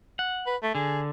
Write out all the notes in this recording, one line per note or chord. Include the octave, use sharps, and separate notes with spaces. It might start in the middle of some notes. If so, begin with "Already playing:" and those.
F#5
B4
A3
D3 G#4